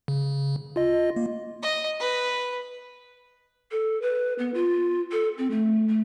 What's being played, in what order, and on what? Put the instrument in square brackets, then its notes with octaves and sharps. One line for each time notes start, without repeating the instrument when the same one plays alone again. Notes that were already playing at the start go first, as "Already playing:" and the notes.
[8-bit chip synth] C#3
F4 D#5
A#3
[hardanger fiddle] D#5
B4
[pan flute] A4
B4
B3
F4
A4
C4
A3
A3